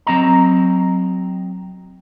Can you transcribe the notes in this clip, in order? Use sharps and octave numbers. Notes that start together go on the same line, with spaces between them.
F#3 C4 D#5 A#5